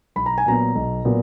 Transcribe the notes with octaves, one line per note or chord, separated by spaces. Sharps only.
B1 B5
A#5
G#5
A#2 F#3 B3 A#5
B1
A#2 F#3 B3